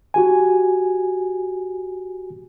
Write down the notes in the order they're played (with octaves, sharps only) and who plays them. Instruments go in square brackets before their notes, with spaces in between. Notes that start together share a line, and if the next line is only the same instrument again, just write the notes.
[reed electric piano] F#4 G4 G#5